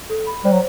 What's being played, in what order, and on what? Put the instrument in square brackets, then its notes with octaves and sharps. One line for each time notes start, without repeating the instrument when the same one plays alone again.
[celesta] A4
B5
[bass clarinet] G3 [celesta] C5
[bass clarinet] F#3